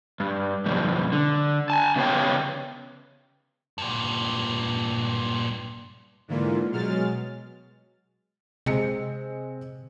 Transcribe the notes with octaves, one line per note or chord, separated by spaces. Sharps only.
G2
F2 B2 G3
D3
G#5 A5
C#3 B3 C#4 C#5 G5
G2 A#2
G#2 D3 E3 A#3 F4
B2 F#3 G#3 F6 A6
C3 G#3 C4 C#7